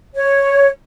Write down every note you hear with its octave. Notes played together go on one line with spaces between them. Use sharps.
C#5